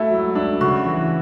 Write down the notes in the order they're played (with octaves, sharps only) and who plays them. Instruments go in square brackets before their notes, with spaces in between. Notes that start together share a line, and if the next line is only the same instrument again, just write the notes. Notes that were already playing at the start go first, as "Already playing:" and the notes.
Already playing: [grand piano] A3 F#4 [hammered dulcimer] E4
[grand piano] F#3
D4
[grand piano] C#3 [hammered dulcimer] F#4
[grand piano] E3